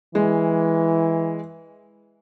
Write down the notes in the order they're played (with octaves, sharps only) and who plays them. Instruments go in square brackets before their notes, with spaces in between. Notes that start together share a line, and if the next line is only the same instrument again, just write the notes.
[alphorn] E3 [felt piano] G#3